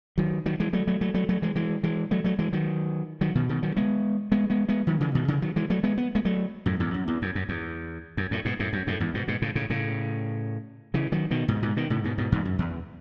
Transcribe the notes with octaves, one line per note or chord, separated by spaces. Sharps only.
D#3 F#3
D#3 F#3
E3 G#3
F#3 A3
F#3 A3
F#3 A3
F#3 A3
F#3 A3
E3 G#3
E3 G#3
E3 G#3
F#3 A3
F#3 A3
E3 G#3
D#3 F#3
D#3 F#3
B2 D#3
B2 D#3
D#3 F#3
G#3 B3
G#3 B3
G#3 B3
G#3 B3
D#3 F#3
C#3 E3
B2 D#3
C#3 E3
D#3 F#3
E3 G#3
F#3 A3
G#3 B3
B3
G#3 B3
F#3 A3
F#2 A2
E2 G#2
F#2
E2
F#2
F#2
E2
F#2
F#2 A2
G#2 B2
F#2 A2
F#2
F#2 A2
E2 G#2
G#2 B2
G#2 B2
A2 C#3
A2 C#3
A2 C#3
C#3 E3
D#3 F#3
B2 D#3
G#2 B2
G#2 B2
B2 D#3
A2 C#3
G#2 B2
G#2 B2
E2 G#2
F#2
E2